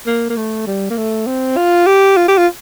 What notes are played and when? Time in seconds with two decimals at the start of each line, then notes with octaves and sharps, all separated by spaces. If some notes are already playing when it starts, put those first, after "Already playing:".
0.07 A#3
0.30 A#3
0.37 A3
0.67 G3
0.90 A#3
0.97 A3
1.27 C4
1.57 F4
1.86 G4
2.17 F4
2.28 G4
2.38 F4